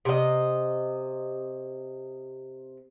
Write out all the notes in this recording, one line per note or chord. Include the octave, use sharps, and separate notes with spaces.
C3 D#5